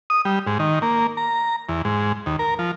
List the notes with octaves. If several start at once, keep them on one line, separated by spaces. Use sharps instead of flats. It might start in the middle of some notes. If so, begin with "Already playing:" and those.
D#6
G3
G#2
D#3
A#3
A#5
E2
G#2
D#2
A#4
F3